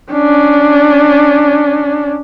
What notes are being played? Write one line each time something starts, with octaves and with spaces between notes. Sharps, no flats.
C#4 D4